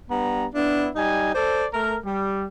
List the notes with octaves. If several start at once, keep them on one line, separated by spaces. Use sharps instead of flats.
G2 B3 A#5
B3 D4 E4
G3 D#4 G#5
A4 C5 D5
A3 A#4
G3